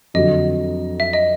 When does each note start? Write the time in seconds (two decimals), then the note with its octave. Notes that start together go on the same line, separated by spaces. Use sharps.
0.14 F2 D3 F#3 D#5
1.00 E5
1.13 D#5